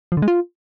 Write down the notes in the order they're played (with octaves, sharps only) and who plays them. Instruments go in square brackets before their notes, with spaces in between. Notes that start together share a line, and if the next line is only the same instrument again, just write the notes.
[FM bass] F3
D3
G#3
F4